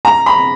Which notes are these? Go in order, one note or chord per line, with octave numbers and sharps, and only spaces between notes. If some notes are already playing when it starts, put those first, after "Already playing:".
A#5
B5